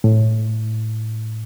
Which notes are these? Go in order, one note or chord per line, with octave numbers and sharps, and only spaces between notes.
A2